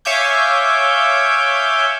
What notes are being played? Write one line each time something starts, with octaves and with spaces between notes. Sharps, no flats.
C#5 E5 F5 G#5 D6 G6